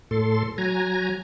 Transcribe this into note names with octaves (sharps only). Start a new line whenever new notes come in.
A2 A4 C6
F#3 G#5 A#5